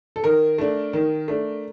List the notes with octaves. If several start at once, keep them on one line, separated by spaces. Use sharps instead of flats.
A4
D#3 A#4
A3 D4
D#3
A3 D4